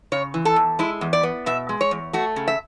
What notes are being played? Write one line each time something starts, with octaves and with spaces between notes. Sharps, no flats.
C#3 C#5
E3
A4
E2
G#3 E4
E2
D5
B3
B2 E5
G#3
C#5
E2
A3 F#4
C#3
E5